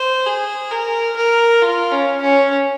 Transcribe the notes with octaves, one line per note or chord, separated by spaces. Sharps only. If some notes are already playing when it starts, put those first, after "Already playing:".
Already playing: C5
G#4
A#4
A#4
F4
C#4
C#4